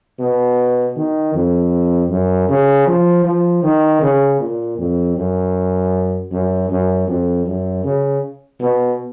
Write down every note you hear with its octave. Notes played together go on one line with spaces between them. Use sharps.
B2
D#3
F2
F#2
C#3
F3
F3
D#3
C#3
A#2
F2
F#2
F#2
F#2
F2
F#2
C#3
B2